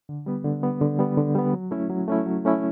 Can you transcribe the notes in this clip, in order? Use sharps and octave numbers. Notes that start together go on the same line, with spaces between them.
D3
G3 B3
D3
G3 B3
D3
G3 B3
D3
G3 B3
F#3
A3 C#4 E4
F#3
A3 C#4 E4
F#3
A3 C#4 E4